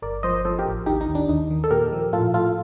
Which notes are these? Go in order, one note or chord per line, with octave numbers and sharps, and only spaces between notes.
G1 A#4 D5
F3 C5 D#5
F3 A4 C5
G4 A#4
A1
D#2 D#4 G4
D#4
D#2
D4
D#2 D#4
D#3
A4
A#2 G4 A#4
F3
A2 F4 A4
A2 F4 A4